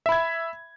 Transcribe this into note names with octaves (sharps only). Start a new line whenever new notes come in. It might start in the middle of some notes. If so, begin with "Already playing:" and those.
E5 B5 G#6